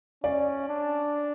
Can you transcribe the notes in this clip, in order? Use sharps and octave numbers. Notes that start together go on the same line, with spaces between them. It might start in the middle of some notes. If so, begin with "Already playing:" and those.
C#4 D5
D4